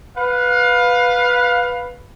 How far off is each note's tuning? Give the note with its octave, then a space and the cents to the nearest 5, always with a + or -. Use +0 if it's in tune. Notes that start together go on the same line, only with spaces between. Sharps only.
B4 +0 F5 +25